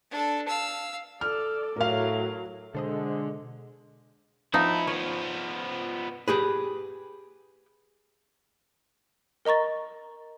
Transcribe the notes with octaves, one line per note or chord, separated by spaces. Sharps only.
D4 A4
F5 E6
A4 D5 F6
A2 F#3 A#4 F5
B2 D3 G#3 A4 C5 D#5
F3 B3 D#4 E4
F3 B3 C#5
G4 G#4 B4
A#4 D#5 A#5 C#6 A6